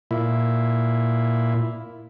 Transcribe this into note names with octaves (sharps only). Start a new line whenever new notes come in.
A#2 E4